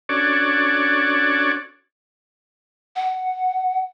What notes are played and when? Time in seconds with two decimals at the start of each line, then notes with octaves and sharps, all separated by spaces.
0.09 C#4 D4 F#4 A4 C#5 D5
2.96 F#5